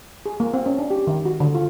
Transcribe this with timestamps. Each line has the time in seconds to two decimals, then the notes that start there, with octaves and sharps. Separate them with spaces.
0.26 G#4
0.40 A#3
0.54 C4
0.66 C#4
0.79 D4
0.90 G4
1.07 D#3
1.25 F#4
1.40 D3
1.55 F4